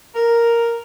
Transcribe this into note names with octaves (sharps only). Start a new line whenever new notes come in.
A#4